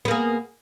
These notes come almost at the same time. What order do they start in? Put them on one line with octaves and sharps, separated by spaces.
B3 A#3 G#4